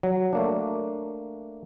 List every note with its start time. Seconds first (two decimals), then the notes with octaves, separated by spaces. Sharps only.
0.03 F#3
0.33 A3 A#3 D4